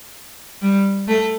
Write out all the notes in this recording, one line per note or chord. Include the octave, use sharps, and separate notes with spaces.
G3
A3